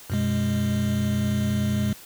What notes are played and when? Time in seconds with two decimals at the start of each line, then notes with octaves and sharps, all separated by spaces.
0.10 F#2 B2 G#3